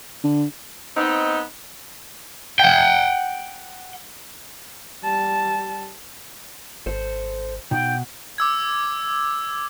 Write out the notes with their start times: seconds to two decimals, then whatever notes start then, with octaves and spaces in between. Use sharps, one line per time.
0.24 D3
0.97 B3 C4 D#4
2.60 F#5 G5
5.03 G3 A5
6.86 G#1 A4 C5
7.71 B2 D#4 F#5 G5
8.38 D6 E6 G#6